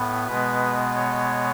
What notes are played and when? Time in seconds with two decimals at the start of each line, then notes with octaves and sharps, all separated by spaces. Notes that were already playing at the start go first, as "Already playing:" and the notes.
Already playing: A2 B3
0.27 B2 G#3 B3 B4
0.95 C#5